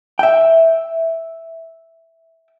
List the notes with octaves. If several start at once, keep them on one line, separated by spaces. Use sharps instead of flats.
E5 G5